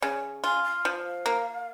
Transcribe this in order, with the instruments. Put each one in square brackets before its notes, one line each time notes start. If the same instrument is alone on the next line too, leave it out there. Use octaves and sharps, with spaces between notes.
[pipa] C#3 [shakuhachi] C#5
[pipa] F4 [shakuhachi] G#5
[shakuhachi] F5
[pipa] F3
A#3